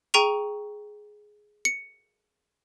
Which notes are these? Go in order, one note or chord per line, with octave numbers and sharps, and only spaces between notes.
G#4 G5 A#5 C#6 D#7 F7
C#7